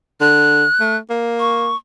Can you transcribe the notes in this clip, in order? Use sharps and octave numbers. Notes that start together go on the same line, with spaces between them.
D3 F#6
A3
A#3
C#6